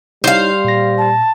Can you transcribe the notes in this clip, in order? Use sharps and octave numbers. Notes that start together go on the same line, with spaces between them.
G3 D#4 E4 C5 C#5 F5
A#2 A#6
A5